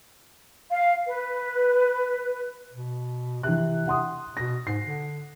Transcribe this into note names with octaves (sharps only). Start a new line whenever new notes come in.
F5
B4
B2
C3 E3 F#6
F#5 C6 D#6
B2 A#6
G#2 C7
D3